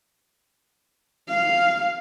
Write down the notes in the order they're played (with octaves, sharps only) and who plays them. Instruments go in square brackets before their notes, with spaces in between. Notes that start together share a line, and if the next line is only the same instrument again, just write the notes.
[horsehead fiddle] F5